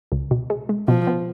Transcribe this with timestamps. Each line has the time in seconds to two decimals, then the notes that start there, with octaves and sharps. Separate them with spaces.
0.12 C#2
0.31 B2
0.50 G#3
0.69 G#3
0.88 B2 F3
1.07 B3